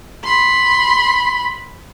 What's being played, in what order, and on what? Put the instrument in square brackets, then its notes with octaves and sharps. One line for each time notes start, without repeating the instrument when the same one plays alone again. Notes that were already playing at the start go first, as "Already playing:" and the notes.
[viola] B5 C6